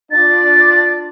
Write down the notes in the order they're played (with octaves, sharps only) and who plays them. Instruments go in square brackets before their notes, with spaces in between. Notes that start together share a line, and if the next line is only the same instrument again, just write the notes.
[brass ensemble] D4 F4 D5 [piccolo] A6